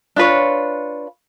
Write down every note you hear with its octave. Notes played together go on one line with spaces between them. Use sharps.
D4 F4 B4 C#5